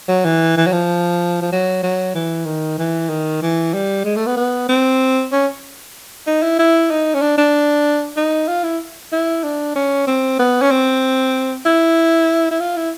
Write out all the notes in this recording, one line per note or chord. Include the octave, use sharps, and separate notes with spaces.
F#3
E3
E3
F#3
F3
F3
F#3
F#3
E3
D#3
E3
D#3
E3
G3
G#3
A3
B3
B3
C4
C#4
D#4
E4
E4
D#4
C#4
D4
D4
D#4
F4
E4
E4
D4
C#4
C4
B3
C#4
C4
E4
E4
F4
E4